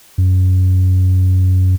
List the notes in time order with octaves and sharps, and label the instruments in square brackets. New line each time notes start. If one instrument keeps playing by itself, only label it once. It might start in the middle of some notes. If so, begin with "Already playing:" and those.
[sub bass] F#2